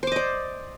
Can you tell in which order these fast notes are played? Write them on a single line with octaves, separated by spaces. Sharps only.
C5 D6 D#5 D5